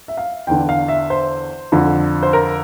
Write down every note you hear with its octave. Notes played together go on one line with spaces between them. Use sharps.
E5
F5
E2 D3 G5
F5
E5
C5
F2 D3
C5
A#4